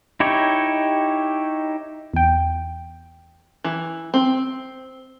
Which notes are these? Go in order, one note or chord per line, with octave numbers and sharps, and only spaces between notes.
D#4 E4 G4 C#5
E2 G5
E3
C4